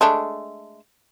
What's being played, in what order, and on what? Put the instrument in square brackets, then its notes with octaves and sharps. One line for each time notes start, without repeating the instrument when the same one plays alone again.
[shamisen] G#3 A3 D4